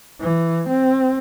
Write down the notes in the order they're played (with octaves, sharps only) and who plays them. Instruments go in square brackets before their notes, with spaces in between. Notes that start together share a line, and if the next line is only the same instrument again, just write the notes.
[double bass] E3
C4